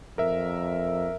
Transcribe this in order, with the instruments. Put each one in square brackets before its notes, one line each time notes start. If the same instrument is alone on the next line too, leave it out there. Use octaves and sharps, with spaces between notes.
[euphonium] F2 [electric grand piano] A#4 E5